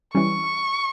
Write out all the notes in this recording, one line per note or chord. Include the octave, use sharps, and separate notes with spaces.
E3 G3 C#4 C#6